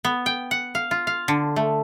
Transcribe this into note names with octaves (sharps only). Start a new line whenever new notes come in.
B3
G5
F#5
F5
F4
F5
D3
A3